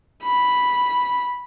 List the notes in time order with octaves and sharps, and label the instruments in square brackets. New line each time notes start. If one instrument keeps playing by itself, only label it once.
[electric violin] B5